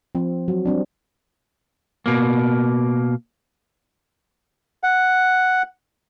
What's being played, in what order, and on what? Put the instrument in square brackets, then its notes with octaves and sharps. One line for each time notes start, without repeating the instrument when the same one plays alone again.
[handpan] F3 C4
F#3
G3 C4 D4
[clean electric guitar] B2 A#3
[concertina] F#5